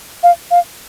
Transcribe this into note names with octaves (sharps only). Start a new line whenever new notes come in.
F5
F5